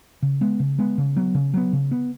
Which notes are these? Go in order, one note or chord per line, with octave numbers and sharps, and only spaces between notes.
C#3
G#3 B3
C#3
G#3 B3
C#3
F#3 B3
C#3
F#3 B3
C#3
B3